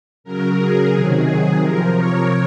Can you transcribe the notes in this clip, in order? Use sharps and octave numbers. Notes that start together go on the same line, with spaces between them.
C#3 F#3 A#4
G#4
C3 D#3 F#3
G#4
C3 F3 A#4
C#5